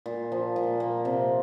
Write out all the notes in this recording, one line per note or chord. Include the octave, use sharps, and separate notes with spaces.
A#2
F3
A#2
A#3
C3